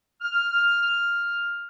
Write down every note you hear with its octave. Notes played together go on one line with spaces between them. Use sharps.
F6